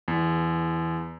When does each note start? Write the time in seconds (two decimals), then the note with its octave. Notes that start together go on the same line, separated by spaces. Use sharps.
0.08 E2